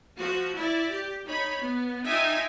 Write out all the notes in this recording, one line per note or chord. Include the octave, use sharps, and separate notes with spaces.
F3 F#4
E4 D5
G4
D#4 C#5 B5
B3
D#4 F4 E5 G5 G#5